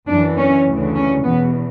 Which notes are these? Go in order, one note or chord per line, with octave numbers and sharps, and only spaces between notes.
F#2 E3 D4
C#4
D2 C#3 E3
C#4
E2 B2 B3